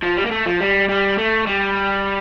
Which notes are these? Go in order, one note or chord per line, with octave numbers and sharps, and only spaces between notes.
F3
G3
A#3
A3
F3
G3
G3
A3
G3